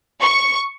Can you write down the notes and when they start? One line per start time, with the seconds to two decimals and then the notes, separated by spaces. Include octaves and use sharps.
0.22 C#6